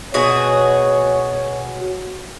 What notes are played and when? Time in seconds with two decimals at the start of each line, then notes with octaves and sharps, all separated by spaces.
0.14 B2 F#4 G#4 C#5